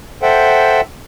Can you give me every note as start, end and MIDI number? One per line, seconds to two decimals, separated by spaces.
0.22 0.81 69
0.22 0.81 72
0.22 0.81 76
0.22 0.81 78
0.22 0.81 79